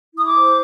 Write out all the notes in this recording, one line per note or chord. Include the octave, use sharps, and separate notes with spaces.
E4 D#6
D6
C5